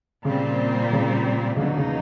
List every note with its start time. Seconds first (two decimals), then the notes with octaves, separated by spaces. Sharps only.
0.25 A#2 C#3 G3 C4
0.93 C#3
1.56 C#3
1.60 E2 B2 D3 F#3 A#3 D#4
1.77 C#3